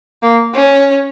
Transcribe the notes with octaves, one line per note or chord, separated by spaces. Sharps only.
A#3
C#4